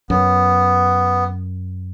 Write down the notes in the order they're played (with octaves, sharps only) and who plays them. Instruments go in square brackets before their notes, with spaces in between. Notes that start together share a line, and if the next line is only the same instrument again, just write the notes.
[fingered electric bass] F#2 [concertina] B3